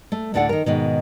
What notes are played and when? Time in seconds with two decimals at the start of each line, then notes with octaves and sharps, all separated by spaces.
0.12 A3
0.34 D2 A2 D4 A4 F#5
0.49 D#3 A#4
0.66 G#2 B2 D#3